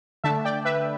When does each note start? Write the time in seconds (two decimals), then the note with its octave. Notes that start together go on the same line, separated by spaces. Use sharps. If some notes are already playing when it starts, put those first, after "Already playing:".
0.24 D3 A3 D4 E5 A5
0.45 D5 G5
0.65 B4 E5